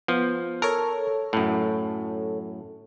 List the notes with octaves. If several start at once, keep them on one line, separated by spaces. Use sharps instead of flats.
F3 B3
A4 A#4 C#5
F#2 A2